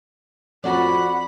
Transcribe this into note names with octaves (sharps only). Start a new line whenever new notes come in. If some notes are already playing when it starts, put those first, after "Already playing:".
F2 F#4 D5 F#5 B5